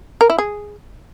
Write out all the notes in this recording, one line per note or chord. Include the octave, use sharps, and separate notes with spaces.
A#4
E4
G#4